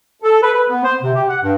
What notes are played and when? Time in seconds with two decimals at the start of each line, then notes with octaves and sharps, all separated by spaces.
0.22 A4
0.43 B4
0.54 B4
0.69 B3
0.85 C5
1.03 C3
1.14 G4
1.29 F#5
1.42 G2